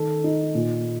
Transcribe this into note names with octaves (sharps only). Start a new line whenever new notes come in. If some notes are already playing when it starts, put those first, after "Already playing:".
Already playing: D#3 A4
D#4
A#2